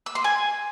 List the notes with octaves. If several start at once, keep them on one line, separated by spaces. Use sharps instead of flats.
E6
C6
G#5